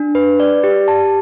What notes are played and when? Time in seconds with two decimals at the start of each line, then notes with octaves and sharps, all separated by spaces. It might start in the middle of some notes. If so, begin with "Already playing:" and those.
Already playing: D4
0.15 B4
0.40 D5
0.64 G4
0.88 A5